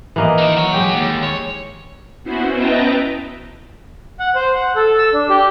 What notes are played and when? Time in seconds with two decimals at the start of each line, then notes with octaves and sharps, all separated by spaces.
0.16 E3 A#3 D#5
0.38 D#4 A#4
0.57 F#4 C#5
0.72 G#3 G4 G5
0.95 D#2
1.23 C#5
2.24 B3 C#4 E4 F#4 C5
2.54 B4 D#5 E5 G5 A5 A#5
4.19 F#5
4.35 C5
4.55 F#5
4.76 A4
4.98 E6
5.14 D4
5.30 G4